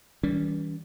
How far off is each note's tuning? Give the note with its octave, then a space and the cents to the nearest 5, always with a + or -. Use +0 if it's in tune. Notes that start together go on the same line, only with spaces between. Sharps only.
E3 -35 G3 +0 C#4 +45